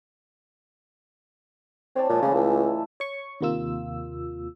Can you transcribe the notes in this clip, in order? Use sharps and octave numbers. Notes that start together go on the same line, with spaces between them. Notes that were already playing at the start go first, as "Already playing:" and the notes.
C4 C#5 D5 A5
A#2 F3 G#3 A#3
C#3 E3 A3
C#2 E5
C#5 C#6
D#2 C3 A#3 F4 E6